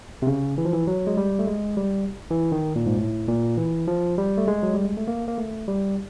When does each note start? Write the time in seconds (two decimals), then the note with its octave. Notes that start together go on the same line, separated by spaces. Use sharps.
0.22 C3
0.27 C#3
0.58 E3
0.65 F3
0.73 E3
0.87 F#3
1.07 G#3
1.17 G3
1.39 A3
1.47 G#3
1.77 G3
2.31 E3
2.52 D#3
2.76 A#2
2.86 G#2
2.98 A2
3.28 A#2
3.58 E3
3.88 F3
4.18 G3
4.38 A3
4.48 G#3
4.63 F#3
4.74 G3
4.85 G#3
4.97 A3
5.08 A#3
5.28 A#3
5.38 A3
5.68 G3